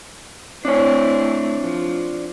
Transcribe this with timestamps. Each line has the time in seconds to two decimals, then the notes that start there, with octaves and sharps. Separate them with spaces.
0.65 A3 C4 D4 E4 C#5
1.60 F3